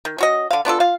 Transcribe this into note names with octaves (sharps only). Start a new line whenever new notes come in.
D#3
C#4 F#4 D#5
D3 F5
B3 D4 F4 A4
F4 F5